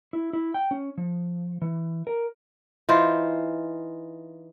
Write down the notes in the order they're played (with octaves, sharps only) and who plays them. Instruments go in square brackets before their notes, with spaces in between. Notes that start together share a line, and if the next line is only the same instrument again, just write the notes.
[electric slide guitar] E4
E4
G5
C#4
F3
E3
A#4
[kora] E3 D#4 F4 C5